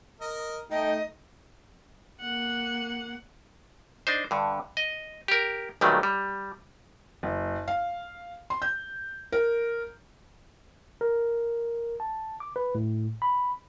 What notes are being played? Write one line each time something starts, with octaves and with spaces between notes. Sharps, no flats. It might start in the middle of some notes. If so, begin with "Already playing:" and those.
A#4 D#5
A3 D#4 A4 D#5 G5
A#3 F#5
D4 D#4 C5
G2 D3
D#5
G4 A#4
B1 A#2 D#3 F#3 G3 A3
G3
F#1
F5
C6
G6
A#4
A#4
A5
D6
B4
A2
B5